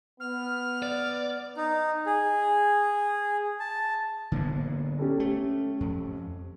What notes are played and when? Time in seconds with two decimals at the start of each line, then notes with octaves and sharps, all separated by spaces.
0.20 B3 F6
0.82 D5
1.57 D#4
2.06 G#4
3.60 A5
4.32 D3 A#3 B3
4.99 C#4 G4 A4
5.20 A3
5.80 F2